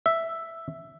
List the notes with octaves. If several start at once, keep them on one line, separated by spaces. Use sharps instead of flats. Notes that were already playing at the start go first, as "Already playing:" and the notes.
E5